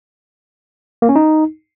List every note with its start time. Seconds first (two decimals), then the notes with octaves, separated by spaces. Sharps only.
1.02 A#3
1.09 C#4
1.16 D#4